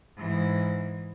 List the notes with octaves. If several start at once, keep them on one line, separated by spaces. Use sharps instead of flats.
G#2 E3